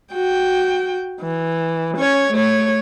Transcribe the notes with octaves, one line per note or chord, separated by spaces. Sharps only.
F#4 G5
E3
C#4 C#5
A3 C#5